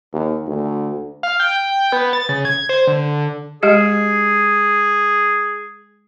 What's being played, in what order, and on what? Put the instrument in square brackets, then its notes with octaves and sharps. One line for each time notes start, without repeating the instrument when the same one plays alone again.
[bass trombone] D#2
D2
[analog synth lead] F5
G5
B3
A6
C#3
G#6
C5
D3
[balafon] G#3 G4 D#5 [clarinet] G#4